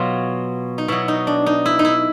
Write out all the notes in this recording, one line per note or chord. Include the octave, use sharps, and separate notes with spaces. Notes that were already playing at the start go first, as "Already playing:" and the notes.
Already playing: B2 F#3 F4
D#4
B2 F#3 E4
D#4
D4
D#4
E4
D#4
E4